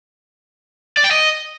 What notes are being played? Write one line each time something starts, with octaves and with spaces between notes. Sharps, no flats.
D5
G5
D#5